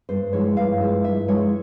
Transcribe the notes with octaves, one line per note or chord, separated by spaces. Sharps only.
G2 C5
F3 G#3 E4 C#5
G2 F5
F3 G#3 E4
G2 E5
F3 G#3 E4 C#5